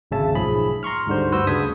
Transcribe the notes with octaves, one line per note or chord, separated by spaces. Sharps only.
G#1 D2 C#3 C#4 E5 A5
B1 G#2 F3 G#4 B5
A#5 C6 C#6 F6
D2 G#2 D3 G3 C5
G2 F#4 B4 C5 E6 G6
D2 C#3 D4 D#6 G#6 B6